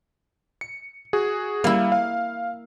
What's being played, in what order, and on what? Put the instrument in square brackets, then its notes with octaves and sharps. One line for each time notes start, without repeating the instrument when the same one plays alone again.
[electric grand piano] C#7
F#4 G#4
[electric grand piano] G3 [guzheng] A#3 E4
[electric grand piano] F5